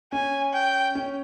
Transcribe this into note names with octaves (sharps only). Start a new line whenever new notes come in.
C#4 G#5
G5
C#4